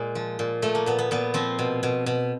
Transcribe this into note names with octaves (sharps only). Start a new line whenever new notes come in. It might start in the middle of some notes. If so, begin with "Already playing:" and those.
Already playing: A#2 G#3
F3
A#2
F3 A3
A#3
A#2 B3
B3
A#2 B3
F3 C4
B2
B2
B2